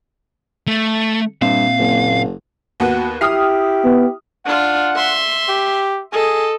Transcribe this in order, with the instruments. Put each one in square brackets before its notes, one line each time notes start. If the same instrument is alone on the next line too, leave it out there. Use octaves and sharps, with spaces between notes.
[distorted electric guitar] A3
[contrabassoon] G2 [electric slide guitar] A#2 C4 E5 [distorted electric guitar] F5
[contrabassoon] F#1
[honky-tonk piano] D#2 B3 B4 [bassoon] F#4
[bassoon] E4 [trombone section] G4 [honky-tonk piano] D#6 F6 C7
[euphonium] B3
[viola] D4 F4 [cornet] F#5
[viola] E5 C6
[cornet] G4
[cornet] G#4 [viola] A4 D#5